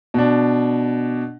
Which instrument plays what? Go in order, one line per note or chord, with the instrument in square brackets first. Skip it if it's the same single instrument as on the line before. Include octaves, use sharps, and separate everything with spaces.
[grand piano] B2 D4